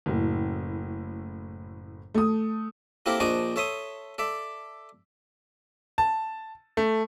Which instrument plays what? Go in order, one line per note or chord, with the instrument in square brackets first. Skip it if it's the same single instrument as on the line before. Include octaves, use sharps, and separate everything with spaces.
[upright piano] F#1 A2
A3 D#6
[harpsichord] A#3 C4 E4 G4 A4 A#4
A#1 D4 C5 D5 D#5 C#6
A4 C#5 E5 C6 D#6
A4 D5 E5
[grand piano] A5
A3